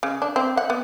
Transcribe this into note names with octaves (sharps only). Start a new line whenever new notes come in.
C#3
D4
C4
F#5
B3